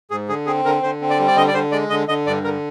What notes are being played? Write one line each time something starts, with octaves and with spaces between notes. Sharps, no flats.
G#2 G#4
D3 G#4
C4 G#4
D3 A#4
D3 C5
C4
D5
G3
D5
D3 D#5
D5
D3 C5
G#3 D5
D3 D#5
D3 D#5
G2 D5
D3 A#4